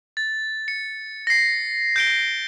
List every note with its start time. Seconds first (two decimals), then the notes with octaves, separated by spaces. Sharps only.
0.17 A6
0.68 C#7
1.27 A#6 C7
1.96 G6 D7 G7